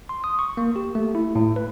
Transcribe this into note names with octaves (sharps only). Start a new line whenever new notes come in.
C6
D#6
C#6
A#3
G4
A3
E4
A2
B4